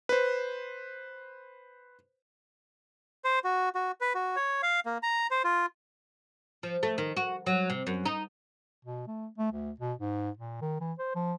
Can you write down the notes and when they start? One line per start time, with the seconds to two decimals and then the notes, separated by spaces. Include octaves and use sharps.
0.09 B4 C5
3.24 C5
3.44 F#4
3.75 F#4
4.01 B4
4.15 F#4
4.36 C#5
4.63 F5
4.86 A#3
5.03 A#5
5.31 C5
5.44 F4
6.63 F3
6.83 A3
6.98 D#3
7.17 F#4
7.46 F#3
7.70 C3
7.87 F#2
8.06 D#4
8.85 B2
9.08 A3
9.38 A3
9.52 D2
9.80 B2
9.98 G#2
10.37 A#2
10.62 D#3
10.80 E3
10.99 C5
11.15 F3